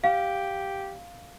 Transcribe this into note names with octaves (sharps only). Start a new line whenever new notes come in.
G4 F5